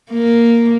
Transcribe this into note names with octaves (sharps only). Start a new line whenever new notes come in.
A#3